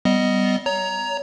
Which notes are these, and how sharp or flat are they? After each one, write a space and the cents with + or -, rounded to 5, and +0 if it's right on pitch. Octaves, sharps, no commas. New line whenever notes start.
G3 -15 B3 +20 D#5 +0
C#5 +25 A#5 +0